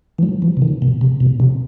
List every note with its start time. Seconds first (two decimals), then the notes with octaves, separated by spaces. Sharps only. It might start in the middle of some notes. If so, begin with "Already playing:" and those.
0.18 E3
0.23 F#3
0.42 E3
0.57 C3
0.62 D#3
0.82 B2
1.01 C3
1.20 B2
1.40 C3